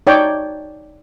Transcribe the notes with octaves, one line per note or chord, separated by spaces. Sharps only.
D#4 C#5 D5 G5